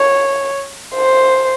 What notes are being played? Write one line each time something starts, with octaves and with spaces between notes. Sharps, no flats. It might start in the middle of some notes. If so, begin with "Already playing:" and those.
Already playing: C#5
C5